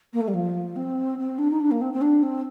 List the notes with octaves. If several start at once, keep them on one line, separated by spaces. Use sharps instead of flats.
A#3
A3
G3
F3
C4
C4
D4
D#4
D4
A#3
C4
C4
D4
C4